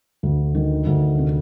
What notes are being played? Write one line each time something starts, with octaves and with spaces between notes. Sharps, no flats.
D2
D#3
D2
C3